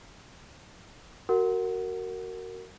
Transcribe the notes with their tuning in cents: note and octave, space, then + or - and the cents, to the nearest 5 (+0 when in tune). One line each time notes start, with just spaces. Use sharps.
F#4 +20 A#4 -20 F#5 +0